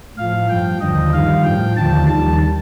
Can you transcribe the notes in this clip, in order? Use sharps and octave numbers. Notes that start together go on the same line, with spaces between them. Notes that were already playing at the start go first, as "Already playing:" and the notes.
A2 F3 F5
G2 F3 G5
D#2 D3 F3 D#5
G2 D#3 G3 F5
A2 F3 G5
D#2 D3 F3 A5
D#2 D#3 G3 A5